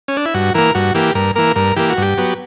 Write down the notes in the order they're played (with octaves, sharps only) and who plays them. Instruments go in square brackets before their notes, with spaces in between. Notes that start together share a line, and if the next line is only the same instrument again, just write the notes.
[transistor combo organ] C#4
D4
E4
G2 F#4
E3 A#3 A#4
G2 F#4
E3 A#3 G4
G2 A#4
E3 A#3 A#4
G2 A#4
E3 A#3 G4
F#4
G2 G4
F#3 B3